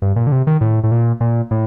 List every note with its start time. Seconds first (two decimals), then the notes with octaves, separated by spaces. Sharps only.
0.02 G2
0.16 A#2
0.27 D3
0.32 C3
0.47 D#3
0.61 A2
0.84 A2
0.91 A#2
1.21 A#2
1.51 A2